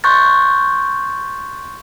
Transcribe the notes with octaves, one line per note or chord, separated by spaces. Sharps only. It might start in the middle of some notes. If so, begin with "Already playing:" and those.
C6 C#6 F#6 G6 A6